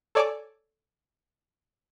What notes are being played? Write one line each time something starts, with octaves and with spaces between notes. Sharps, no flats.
A4 C#5 D5 G#5 A5 D6